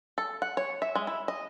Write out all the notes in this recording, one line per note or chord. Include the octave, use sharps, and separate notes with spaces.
A4
F#5
C#5
E5
G#3
E4
D#5